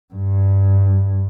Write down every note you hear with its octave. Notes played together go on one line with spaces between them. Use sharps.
G2